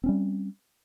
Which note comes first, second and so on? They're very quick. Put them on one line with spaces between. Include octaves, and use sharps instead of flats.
C4 C#4 G3